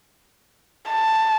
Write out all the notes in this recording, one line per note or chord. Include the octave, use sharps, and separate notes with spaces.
A5